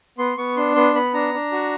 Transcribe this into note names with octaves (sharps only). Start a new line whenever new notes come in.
B3 C6
B3 C#6
D4 C6
B3 C6
B3 B5
D4 A#5
D4
F#4